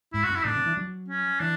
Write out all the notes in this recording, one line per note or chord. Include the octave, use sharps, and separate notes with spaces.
G#2 E4
F#4
F#2
E4
A2 D4
B2
E3
F#3
C#4
E3 D4